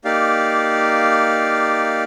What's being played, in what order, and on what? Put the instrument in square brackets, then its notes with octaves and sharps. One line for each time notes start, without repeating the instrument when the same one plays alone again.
[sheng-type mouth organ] A#3 D#4 G4 D5 F5